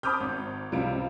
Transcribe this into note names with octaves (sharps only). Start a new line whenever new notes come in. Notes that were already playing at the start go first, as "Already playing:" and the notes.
A5 B5 D6 D#6 F6 G6
G#1
C#2 C3 G3 F4 F5 D7